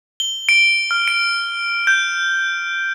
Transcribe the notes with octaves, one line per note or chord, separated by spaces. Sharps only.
G7
D7
F6
D7
G6